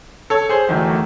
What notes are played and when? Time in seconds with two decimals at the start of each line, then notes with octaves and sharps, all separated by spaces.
0.30 A4 C#5
0.49 G#4 C5
0.69 E2 D#3 F#3 A3